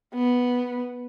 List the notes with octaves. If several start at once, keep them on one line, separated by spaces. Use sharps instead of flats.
B3